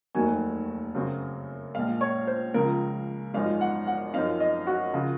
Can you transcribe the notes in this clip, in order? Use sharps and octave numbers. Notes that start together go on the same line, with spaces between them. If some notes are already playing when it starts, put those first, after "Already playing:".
F1 D#2 D#3 F#3 G#5
F#2 C#3 F#3 C4
A#1 A#2 G#3 F5
C#5
C5
C#2 C#3 F3 A#4
G#1 F#2 F3 G#3 D#4 F5
F#5
F#5
F#2 F3 C4 D#4 F5
D#5
F#4
C#3 F3